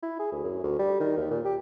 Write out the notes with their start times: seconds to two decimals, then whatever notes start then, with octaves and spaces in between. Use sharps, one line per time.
0.03 E4
0.19 G#4
0.32 D2
0.44 F#2
0.64 D2
0.79 G3
1.00 D#3
1.17 D#2
1.30 A#2
1.45 G4